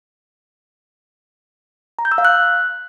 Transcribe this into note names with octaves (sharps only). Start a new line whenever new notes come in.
A#5
G6
E6
F5
F#6